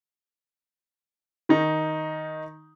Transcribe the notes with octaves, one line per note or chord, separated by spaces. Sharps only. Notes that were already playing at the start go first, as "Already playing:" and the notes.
D#3 D#4